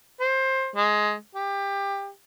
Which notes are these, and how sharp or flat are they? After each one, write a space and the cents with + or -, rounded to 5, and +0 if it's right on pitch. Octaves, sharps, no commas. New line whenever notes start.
C5 +20
G#3 +15
G4 +20